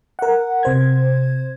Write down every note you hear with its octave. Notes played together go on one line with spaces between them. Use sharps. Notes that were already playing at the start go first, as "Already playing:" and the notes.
A#4 F#5
C3 C5 G#6